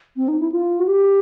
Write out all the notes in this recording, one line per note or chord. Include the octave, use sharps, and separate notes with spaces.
C4
D#4
E4
F4
F#4
G4